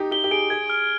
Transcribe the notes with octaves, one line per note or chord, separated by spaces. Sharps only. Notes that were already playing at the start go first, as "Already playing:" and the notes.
Already playing: D#4 G4
G4 G7
G4
G#4 D7
G#4 G#6
F6